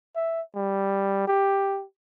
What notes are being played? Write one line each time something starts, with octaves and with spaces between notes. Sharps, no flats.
E5
G3
G4